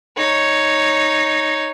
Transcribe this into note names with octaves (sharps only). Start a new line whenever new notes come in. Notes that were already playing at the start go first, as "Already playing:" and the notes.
D#4 C#5